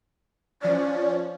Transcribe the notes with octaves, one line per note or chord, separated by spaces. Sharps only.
F3 C#4 D5